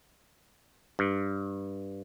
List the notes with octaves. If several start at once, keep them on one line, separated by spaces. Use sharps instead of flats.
G2